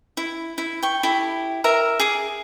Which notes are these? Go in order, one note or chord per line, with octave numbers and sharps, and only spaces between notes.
E4
E4
G5 C#6
E4 G4 A4
A#4 E5 A#5
G#4 D6